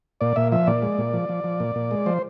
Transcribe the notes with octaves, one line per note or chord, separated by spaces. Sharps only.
A#2 D5
A#2 E5
F3 E5
A#2 D5
G#3
A#2
F3
F3
F3
A#2
A#2
G#3
F3 C5